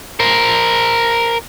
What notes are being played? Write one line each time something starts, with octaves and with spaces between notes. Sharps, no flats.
A#4 C5